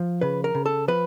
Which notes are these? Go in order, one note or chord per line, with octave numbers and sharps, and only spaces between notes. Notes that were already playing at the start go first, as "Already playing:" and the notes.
Already playing: F3
C#3 B4
A#4
C#3
A4
F3 B4